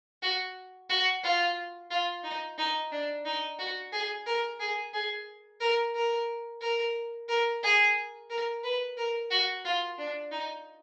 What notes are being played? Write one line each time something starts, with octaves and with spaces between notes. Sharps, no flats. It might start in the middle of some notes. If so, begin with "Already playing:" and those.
F#4
F#4
F4
F4
D#4
D#4
D4
D#4
F#4
G#4
A#4
G#4
G#4
A#4
A#4
A#4
A#4
G#4
A#4
B4
A#4
F#4
F4
D4
D#4